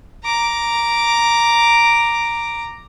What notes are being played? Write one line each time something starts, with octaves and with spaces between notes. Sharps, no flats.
A#5 D6